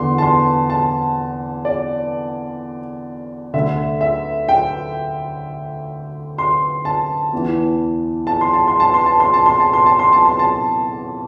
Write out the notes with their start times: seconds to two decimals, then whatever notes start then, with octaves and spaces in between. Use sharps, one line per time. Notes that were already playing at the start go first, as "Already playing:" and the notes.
Already playing: E2 D3 C6
0.18 A5
0.22 C6
0.70 A5
1.65 D5
3.54 D2 D3 E5
4.01 E5
4.49 G5
6.38 C6
6.85 A5
7.33 E2 E3
8.27 A5
8.41 C6
8.53 A5
8.68 C6
8.80 A5
8.94 C6
9.06 A5
9.20 C6
9.34 A5
9.46 C6
9.60 A5
9.73 C6
9.86 A5
9.99 C6
10.13 A5
10.26 C6
10.39 A5